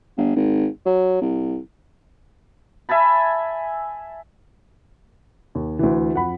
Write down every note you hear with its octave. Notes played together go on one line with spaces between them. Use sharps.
G1
G#1
F#3
C2
E5 G#5 A5 B5
D#2
D2 E3
F2 F#5 B5